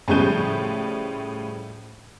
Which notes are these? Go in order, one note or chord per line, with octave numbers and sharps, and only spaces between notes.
A2 C#3 F3 G3 G6 D#7